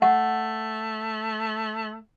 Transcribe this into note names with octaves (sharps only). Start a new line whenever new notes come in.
A3 F#5